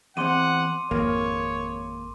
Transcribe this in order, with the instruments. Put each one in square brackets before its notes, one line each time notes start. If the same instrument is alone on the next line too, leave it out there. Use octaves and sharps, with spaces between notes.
[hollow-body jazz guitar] E2 C4 [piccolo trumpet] F#5 [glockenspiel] C6 D6 D#7
[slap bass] G#1 F2 [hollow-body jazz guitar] A#3 [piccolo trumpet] C#5